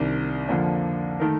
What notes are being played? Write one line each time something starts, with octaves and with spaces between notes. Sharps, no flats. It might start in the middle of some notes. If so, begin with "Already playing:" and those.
Already playing: C2 C3 D#3 G3 D4
F2 D3 F3 A#3 D4
D#3 A3 D#4 A#4